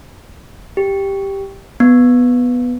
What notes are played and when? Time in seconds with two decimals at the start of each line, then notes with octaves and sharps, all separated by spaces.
0.77 G4
1.80 B3